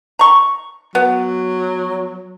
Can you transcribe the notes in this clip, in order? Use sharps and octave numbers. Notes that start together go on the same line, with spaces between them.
A#5 C#6
F#3 B3